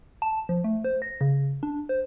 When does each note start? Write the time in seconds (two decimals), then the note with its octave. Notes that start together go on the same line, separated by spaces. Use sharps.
0.22 A5
0.49 F3
0.64 A3
0.84 C5
1.02 A#6
1.21 C#3
1.63 D4
1.89 C5